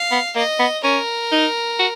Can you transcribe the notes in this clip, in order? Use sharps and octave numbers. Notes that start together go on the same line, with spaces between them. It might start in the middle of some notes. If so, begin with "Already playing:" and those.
Already playing: F5
B3
A#3 D#5
B3
C#4 A#4
D#4
F#4